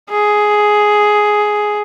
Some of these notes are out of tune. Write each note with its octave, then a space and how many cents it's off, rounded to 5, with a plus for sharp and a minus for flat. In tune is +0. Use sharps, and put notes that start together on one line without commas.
G#4 +10